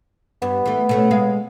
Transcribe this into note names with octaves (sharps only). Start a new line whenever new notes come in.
G2 B3
E3 A3
B2 A3 C#4
B2 G#3 F5